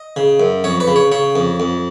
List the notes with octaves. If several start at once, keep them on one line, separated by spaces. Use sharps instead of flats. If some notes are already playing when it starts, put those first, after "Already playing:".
Already playing: D#5
C#3
F#2
F2 C#5
B4
C#3
C#5
C#3 C#5
F2
F2